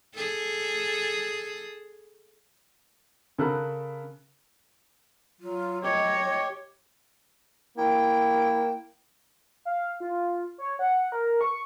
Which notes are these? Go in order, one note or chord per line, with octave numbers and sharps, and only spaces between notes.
G#4 A4
C#3 A4 A#4 B5 F#6
F#3 F4
G4 C#5 D#5
A#3 E4 G5
F5
F4
C#5
F#5
A#4
C#6